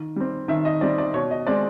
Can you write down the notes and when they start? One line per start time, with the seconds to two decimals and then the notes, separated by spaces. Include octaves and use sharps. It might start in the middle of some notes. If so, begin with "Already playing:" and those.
Already playing: D#3
0.16 G3 C4
0.48 D#3 E5
0.65 D#5
0.81 G3 C4 D5
0.98 D5
1.14 B2 C#5
1.31 D#5
1.47 G#3 C4 D5